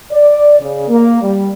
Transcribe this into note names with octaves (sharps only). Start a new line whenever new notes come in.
D5
C#3
A#3
G3